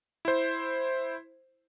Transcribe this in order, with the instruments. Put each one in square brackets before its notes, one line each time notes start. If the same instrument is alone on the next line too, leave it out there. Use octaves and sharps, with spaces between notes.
[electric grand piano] E4 C5